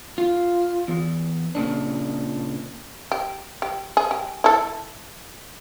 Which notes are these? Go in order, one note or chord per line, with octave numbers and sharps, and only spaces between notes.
F4
E2
A#2 C#3 D4
G4
G4
G#4
G4
E4 A4